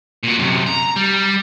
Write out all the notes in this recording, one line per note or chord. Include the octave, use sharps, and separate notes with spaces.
A#2 F#4
F#2 C3
A#5
G3